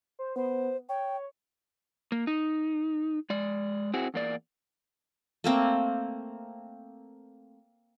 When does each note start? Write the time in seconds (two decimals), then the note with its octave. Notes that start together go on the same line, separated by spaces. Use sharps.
0.19 C5
0.36 B3 C5
0.89 C#5 G5
2.12 A#3
2.27 D#4
3.30 G#3 D5
3.94 C4 E4 F#4 G#4
4.14 E2 A#3 D5
5.44 A3 A#3 C4